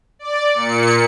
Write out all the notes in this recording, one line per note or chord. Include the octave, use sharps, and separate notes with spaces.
D5
A#2 C#7